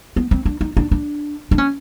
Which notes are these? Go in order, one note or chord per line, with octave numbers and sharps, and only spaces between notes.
B3
C4
D4
D#4
D4
D4
D4
C#4